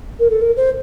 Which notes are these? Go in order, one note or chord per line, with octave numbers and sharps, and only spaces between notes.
A#4
A4
A#4
C5